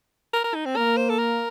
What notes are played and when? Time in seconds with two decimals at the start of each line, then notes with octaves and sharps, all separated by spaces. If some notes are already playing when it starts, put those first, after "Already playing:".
0.34 A#4
0.44 A#4
0.55 D#4
0.65 C4
0.76 A#3 A#4
0.97 C5
1.09 A4
1.18 A#4